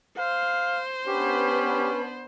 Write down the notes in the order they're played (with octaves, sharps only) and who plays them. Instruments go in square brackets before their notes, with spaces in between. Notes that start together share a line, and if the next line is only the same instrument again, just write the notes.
[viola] C5 [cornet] F5
[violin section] B3 D4 B4 [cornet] C#4 [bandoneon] G4